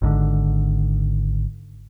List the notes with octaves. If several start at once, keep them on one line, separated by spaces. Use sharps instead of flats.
G#1 G#2 B2 D3